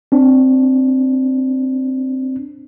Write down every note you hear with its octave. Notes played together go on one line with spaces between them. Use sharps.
C4 D4